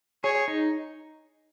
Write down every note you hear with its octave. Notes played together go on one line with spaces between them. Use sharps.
G#4 C#5
D#4